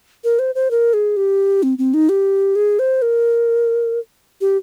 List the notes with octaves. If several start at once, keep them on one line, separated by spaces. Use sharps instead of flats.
A#4
C5
C5
A#4
G#4
G4
C4
C4
D#4
G4
G#4
C5
A#4
G4